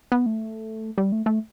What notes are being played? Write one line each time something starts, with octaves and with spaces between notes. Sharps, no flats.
B3
A3
G3
A3
A3